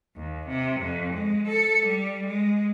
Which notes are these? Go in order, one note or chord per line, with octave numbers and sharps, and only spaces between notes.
D#2
C3
F2
G#3
A4
G3
G#3